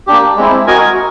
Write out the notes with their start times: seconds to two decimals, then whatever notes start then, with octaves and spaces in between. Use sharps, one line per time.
0.07 A#3 D4 G4
0.37 G#3 C4 E4
0.67 F#4 A#4 D#5 G#5